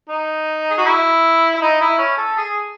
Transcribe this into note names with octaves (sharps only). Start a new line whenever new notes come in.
D#4
G#4
F#4
E4
E4
D#4
E4
C#4
A4
G#4